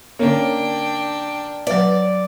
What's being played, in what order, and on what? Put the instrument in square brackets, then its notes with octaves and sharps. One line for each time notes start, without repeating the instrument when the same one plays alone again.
[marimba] D3 C#4 C#5 [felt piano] A#3 [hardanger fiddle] D4 G5
[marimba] F#3 B4 [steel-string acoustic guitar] D5